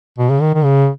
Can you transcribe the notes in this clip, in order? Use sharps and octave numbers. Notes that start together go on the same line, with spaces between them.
B2
C#3
D#3
D#3
C#3